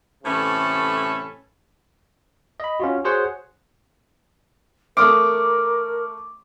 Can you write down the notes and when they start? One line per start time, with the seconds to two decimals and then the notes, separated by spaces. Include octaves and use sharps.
0.24 A2 C3 E3 C#4 A4 B5
2.60 D#5 B5
2.80 C#4 F4 F#4
3.04 F#4 G#4 C5 C#5 F#5
4.97 A3 A#4 D6 D#6 F6